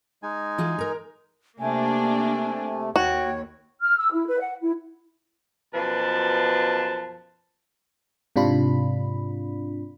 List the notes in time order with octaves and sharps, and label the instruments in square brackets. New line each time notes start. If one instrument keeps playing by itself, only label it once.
[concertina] G#3 D#4 G#5
[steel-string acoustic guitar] E3 F4 G#4
A#4 A#5
[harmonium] C3 A3 [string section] A#3 D4 [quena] G#5
[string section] D#2 [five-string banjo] F#4 [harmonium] C#5 [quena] G5
[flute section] F6
E6
E4
B4
F#5
E4
[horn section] F#2 B2 F3 B4 A5
[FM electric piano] G#2 C3 D4 F4 B5